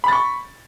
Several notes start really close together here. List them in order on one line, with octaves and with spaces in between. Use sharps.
B5 A6 C#6